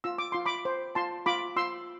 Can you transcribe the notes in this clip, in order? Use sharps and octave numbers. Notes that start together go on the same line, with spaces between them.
F4 E6
D6
F4 C6
B5 D6
C5
F4 A5 C6
F4 B5 D6
F4 C6 E6